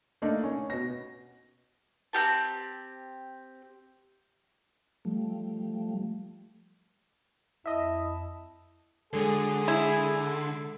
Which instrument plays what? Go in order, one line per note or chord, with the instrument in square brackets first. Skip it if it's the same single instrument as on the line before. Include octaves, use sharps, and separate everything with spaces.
[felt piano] A3 A#3 D4 D#4
C#4
B2 A#6
[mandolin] C4 E4 G4 A5
[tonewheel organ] F3 G3 A3
[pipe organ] F2 A5 [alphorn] E4 [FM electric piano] D#5 E5
[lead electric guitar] D3 [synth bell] G#3 A4 [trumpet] G#4
[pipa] E4